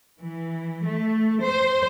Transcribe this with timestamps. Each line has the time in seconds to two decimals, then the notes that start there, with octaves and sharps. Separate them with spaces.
0.19 E3
0.84 A3
1.41 C5